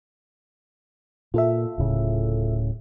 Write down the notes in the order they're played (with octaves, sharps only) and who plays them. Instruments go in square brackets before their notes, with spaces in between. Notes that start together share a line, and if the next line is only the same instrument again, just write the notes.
[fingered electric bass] A#2 [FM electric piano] F4 A4 E5
[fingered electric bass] D1 A2 C#3